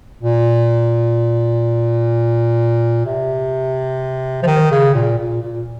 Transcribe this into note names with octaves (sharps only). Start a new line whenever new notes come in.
A#2
C3
F3
D#3
C#3
A#2
A#2
A#2